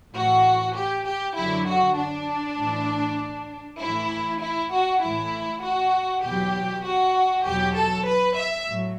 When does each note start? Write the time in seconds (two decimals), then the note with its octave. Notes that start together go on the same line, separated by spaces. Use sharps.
0.13 A2 E3 F#4
0.76 G4
1.05 G4
1.36 F#2 D3 F#3 E4
1.67 F#4
1.96 D4
2.58 A2 E3
3.80 A2 E3 E4
4.40 E4
4.72 F#4
5.02 A2 E3 E4
5.63 F#4
6.23 E2 B2 F#3 G4
6.85 F#4
7.45 E2 B2 F#3 G4
7.76 A4
8.07 B4
8.37 E5
8.67 A2 F#3